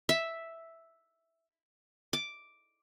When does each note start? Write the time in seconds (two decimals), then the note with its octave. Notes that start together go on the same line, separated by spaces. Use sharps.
0.09 E5
2.13 D6